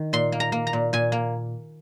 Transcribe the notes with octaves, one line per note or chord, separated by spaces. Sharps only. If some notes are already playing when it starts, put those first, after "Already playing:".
Already playing: D#3
A#2 C6
A#3
A#5
A#3
A#5
A#2
A#2 G#5
A#3